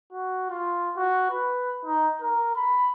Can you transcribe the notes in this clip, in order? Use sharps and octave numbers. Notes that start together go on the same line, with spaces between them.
F#4
F4
F#4
B4
D#4
A#4
B5